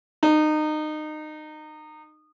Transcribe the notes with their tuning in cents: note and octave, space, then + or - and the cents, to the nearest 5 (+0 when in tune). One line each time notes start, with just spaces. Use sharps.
D#4 -25